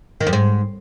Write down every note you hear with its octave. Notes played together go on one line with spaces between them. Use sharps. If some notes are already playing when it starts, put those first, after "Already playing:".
D#3
F2
G#2